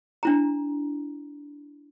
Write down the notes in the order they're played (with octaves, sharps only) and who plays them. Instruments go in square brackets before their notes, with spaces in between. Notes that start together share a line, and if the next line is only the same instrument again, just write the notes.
[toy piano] D4 E4 A#5